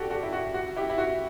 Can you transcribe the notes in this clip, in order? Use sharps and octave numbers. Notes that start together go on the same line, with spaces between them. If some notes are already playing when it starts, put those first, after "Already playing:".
Already playing: F#4 G4 A4 D5 G5
F#4 A4
E4
F#4
F#4
E4 G4
E4
F#4